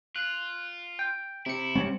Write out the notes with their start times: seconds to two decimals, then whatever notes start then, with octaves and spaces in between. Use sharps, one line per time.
0.16 F4 F#6
0.99 G5
1.46 C3 E4 C#7
1.75 G3 C4 C#4